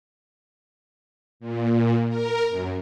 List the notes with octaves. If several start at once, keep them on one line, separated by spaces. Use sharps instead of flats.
A#2
A#4
F#2